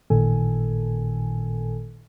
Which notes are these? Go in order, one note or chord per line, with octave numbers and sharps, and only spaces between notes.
A1 A#2 D#3 A4 G#5